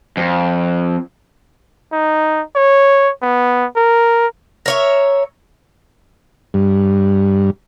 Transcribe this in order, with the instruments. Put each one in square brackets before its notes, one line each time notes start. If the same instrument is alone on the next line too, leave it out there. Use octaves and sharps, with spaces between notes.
[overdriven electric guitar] F2
[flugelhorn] D#4
C#5
B3
A#4
[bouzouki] A#4 C#5 E5
[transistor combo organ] G2